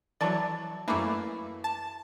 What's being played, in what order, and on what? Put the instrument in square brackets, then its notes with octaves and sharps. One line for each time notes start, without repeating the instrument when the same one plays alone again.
[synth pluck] E3 F#3 [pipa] D5 A5 C#6
[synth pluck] F#2 A3 A#3 [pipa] E3 E4 D5
[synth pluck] A5